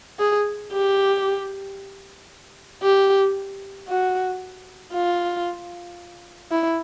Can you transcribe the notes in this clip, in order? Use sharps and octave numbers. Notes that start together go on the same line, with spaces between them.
G#4
G4
G4
F#4
F4
E4